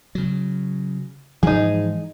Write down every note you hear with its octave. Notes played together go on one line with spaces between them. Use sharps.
C#3 F#3
G#2 E3 F3 G#3 D#4 G#4